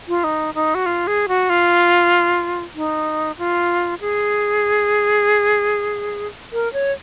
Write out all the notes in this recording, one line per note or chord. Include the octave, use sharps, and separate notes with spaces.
F4
D#4
D#4
F#4
F4
G#4
F#4
F4
D#4
F4
G#4
A#4
C#5